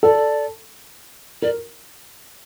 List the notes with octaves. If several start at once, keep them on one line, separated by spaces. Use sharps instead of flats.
A4 D5
A#4 D5